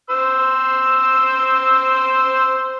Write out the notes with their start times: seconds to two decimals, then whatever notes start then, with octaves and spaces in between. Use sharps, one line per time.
0.10 C5 E6